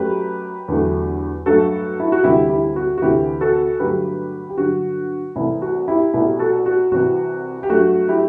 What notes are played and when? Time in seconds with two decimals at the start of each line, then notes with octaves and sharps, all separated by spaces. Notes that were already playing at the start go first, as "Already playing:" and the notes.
Already playing: F#2 F#3 A3 G4 B4
0.68 E2 D3 F#3 A3
1.46 G2 F#3 A3 F#4 A4
2.00 E4
2.12 F#4
2.24 D2 C3 E3 G3 E4 G4
2.50 E4 G4
2.76 F#4
2.98 F#4
3.02 D2 C3 E3 E4 G4
3.41 F#4 A4
3.79 G2 D3 F#3 A3 G4 B4
4.49 G4
4.58 G2 D3 F#3 F#4
5.36 C2 C3 E3 A3 E4
5.62 F#4
5.88 E4 G4
6.14 C2 B2 A3 E4 G4
6.39 F#4 A4
6.66 F#4
6.91 C2 C3 E3 F#4
7.63 G4
7.69 G2 F#3 A3 F#4
8.08 E4 G4